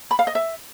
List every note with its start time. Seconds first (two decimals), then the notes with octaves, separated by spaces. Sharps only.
0.11 B5
0.19 F5
0.27 D#5
0.35 E5